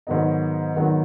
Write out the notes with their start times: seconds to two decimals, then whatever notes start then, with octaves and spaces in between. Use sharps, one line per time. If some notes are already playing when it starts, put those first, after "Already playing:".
0.07 G#2 D#3 F#3 B3 D#4
0.76 G#2 D#3 F#3 B3 D#4